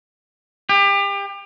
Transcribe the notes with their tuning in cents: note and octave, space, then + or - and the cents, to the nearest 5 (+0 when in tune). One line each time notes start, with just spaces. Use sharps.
G4 +30